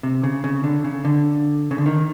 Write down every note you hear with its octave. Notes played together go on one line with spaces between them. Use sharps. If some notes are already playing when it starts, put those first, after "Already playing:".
C3
C#3
C#3
D3
C#3
D3
C#3
D3
D#3